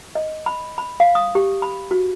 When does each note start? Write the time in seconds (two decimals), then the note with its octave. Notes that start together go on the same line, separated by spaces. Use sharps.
0.15 D#5
0.46 B5
0.78 B5
1.00 F5
1.15 D#6
1.35 G4
1.62 B5
1.91 F#4